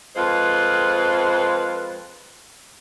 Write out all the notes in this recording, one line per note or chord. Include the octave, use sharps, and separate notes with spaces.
F2 G#3 F4 B4 C5